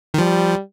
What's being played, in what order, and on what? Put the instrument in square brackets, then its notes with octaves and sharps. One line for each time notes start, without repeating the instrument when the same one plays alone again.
[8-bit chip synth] D#3
[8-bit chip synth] F3 [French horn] G3